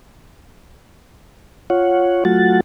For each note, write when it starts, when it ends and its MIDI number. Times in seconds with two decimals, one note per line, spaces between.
1.70 2.24 65
1.70 2.24 73
1.70 2.24 78
2.25 2.61 54
2.25 2.61 57
2.25 2.61 65
2.25 2.61 66
2.25 2.61 78
2.25 2.61 93